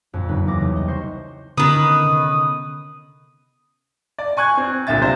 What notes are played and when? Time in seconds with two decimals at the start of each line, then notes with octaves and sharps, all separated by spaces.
0.13 A#1 F2
0.29 F#1 D#4 B4
0.47 E2 D6 A#6
0.61 C2
0.76 D#5
0.88 C5 C#6
1.58 D3 D#3 B3 C#4 B4 D#6
2.04 C3
4.18 D5
4.37 G#5 C#6 F#6 G#6
4.57 C4
4.87 C2 A#2 D3 E5 A6
5.01 C3 C5 F5